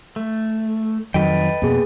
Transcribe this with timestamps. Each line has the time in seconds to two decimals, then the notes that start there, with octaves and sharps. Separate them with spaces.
0.16 A3
1.14 F2 D#3 F#3 A4 B4 D#5 G5
1.62 F2 B2 A#3 G#4